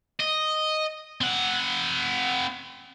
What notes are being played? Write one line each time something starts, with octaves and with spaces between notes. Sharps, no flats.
D#5
C4 F#5